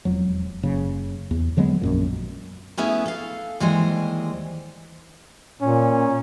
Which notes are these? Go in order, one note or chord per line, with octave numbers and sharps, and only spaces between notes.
E1 F2 F#3
F#1 C#3
E2
D3 F#3 G#3 B3
A#1 F#2 A#2
A3 B3 C#4 E4 G#4 E5
A4 F5
D#2 E3 G3 G#3 C5 D#5
A#2 C#4